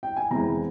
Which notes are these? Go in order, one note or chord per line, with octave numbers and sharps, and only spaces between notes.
G5
G#5
E2 E3 G#3 C4 E4 A#5